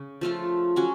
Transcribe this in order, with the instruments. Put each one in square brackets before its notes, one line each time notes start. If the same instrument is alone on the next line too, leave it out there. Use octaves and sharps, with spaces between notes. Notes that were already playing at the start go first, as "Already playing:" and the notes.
Already playing: [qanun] C#3
F3 A3 F4 A4
F#3 C#4 F#4